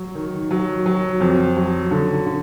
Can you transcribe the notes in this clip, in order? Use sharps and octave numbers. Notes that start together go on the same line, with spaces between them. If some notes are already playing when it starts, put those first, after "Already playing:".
Already playing: F#3
D#3
F#3
F#3
F2
F#3
D3
D3